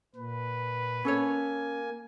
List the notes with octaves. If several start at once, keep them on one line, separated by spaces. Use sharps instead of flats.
A#2 B4
A#3 C#4 A4 C#5 G#5